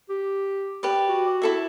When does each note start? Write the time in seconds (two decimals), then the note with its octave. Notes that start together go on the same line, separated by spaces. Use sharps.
0.09 G4
0.83 G4 B4 D5
1.09 F#4
1.42 E4 A4 E5